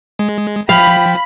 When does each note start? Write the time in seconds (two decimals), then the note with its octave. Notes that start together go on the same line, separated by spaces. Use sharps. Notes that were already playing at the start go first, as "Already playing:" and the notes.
0.19 G#3
0.69 F3 F5 G5 B5